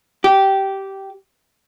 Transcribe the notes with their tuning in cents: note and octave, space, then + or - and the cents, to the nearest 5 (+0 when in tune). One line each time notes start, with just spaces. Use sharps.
G4 -15